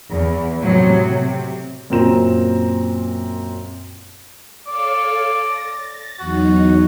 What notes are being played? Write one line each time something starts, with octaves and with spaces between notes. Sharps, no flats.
E2
A2 C3 F#3
C3
F#2 A#2 F#3 C4 A#5 E7
A4 C#5 D5 F5
A6 A#6
E2 F#3 D#4 F#4